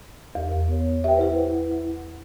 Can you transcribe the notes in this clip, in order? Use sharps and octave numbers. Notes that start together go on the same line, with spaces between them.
E2 G4 A#4
B3 C#5
G4 B4 E5 G5
E4 B4 C5 F#5